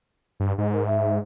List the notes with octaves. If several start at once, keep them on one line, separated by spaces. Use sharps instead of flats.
G2
G#2 D#5
A#4
E5